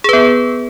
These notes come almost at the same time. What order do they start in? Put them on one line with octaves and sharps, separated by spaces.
G#4 B4 B3